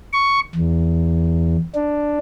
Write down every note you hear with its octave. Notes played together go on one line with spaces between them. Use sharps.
C#6
E2
D4